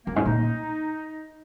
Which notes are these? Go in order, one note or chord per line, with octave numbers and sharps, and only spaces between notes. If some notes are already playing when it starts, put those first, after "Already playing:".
F#2 A#3
G#2 C#4
A#2 D#4